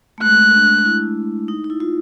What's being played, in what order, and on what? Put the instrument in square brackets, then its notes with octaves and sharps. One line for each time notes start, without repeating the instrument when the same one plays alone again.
[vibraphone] A3
[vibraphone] G#3 [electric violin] F#6
[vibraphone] D4
E4
D#4
D#4
E4
F4